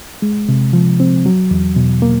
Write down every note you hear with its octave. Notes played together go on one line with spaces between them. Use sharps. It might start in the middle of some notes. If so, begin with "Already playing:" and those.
G#3
C3
F3
C4
F#3
E2
B2
A#3